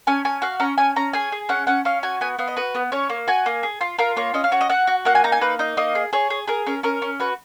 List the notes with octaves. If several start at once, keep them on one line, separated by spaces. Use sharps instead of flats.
C#4 G#5
C#4 G#5
F#4 F5
C#4 A#5
C#4 G#5
C#4 A#5
G#4 G#5
G#4
C#4 F#5
C#4 F#5
C#4 F5
F#4 G#5
B3 G#5
B3 F5
D#5
F#4 B4
B3
C#4 C#5
A#3
F#4 G#5
A#3
G#4
F4
F4 A#4
A#3 C#5
C#4 D#5
F5
F#4 C#5
D#5
F#4 F#5
F#4
A#3 F#5
G#5
D#4 A#5
G#5
A#3 B4
D#4 D#5
A#3 D#5
G#4
G#4 C#5
G#4
G#4 A#4
C#4 A#4
C#4 A#4
C#4
F#4 B4